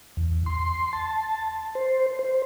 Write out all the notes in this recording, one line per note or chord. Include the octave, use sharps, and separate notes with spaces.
E2
C6
A5
C5
C5